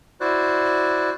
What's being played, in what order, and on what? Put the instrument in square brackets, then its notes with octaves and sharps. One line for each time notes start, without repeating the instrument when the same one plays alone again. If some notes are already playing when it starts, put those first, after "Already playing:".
[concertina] E4 F#4 C5 D5 F#6